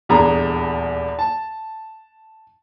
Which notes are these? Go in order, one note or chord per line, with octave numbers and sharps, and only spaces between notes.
D#1 E2 G2 G#4 A#5
A5